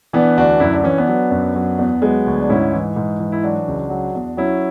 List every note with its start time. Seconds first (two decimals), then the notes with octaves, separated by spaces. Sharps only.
0.13 E3 B3 D4
0.37 D2 D4 F#4
0.60 F#2 E4
0.72 D4
0.84 E3 C#4
0.98 B3 D4
1.08 F#3
1.31 F#2
1.55 F#3
1.79 E2
2.02 F#3 G#3 B3
2.26 D2
2.41 D4
2.49 G#2 C#4 E4
2.73 E3
2.96 G#2
3.19 E3
3.32 E4
3.43 F#3 D4 F#4
3.68 C#2
3.90 F#3
4.15 E2
4.37 F#3 C#4 E4